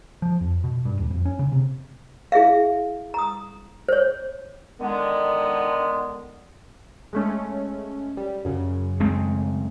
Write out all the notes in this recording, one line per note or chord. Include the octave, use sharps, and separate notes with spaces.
F3
F2
B2
G2
D#1
F2
C#4
C#3
C3
E4 G#4 E5 F5
A#5 D#6
C5 C#5
D3 D#3 G#3 B3
G#3 A3 C#4
G3
F#2 C#3
G#3 A3 C4